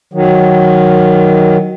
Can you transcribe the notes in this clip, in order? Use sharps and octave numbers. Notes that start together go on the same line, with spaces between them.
D#3 F#3